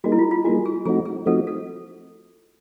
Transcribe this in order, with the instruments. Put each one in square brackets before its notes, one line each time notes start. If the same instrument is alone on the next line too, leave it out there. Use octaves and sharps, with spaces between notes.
[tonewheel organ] G3 A#3 D#4 G#4 [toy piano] F#4
[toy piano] E4
F4
F4
[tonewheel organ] G3 A#3 D#4 G#4 [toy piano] F#4
[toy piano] G#4
[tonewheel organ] F3 A3 C4 D#4 F#4 [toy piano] G#4
[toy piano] G#4
[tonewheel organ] F3 A3 C4 D#4 F#4 [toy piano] A4
[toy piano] A4